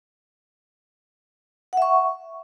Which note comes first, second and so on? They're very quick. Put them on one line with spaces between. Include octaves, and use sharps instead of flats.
F#5 E5 C#6